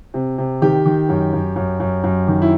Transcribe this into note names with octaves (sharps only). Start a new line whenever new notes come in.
C3
C3
D#3 G4
D#3
F#2
F#2
F#2
F#2
F#2
D#3
E4